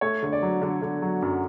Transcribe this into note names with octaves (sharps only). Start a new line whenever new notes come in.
A3 C#5
D3
D5
F#3
D3
D3
F#3
F#2